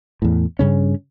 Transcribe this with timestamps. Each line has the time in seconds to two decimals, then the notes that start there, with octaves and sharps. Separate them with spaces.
0.22 E2 A2
0.59 G2 C#3 C#4